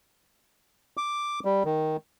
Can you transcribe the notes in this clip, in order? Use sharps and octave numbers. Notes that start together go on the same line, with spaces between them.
D6
G3
D#3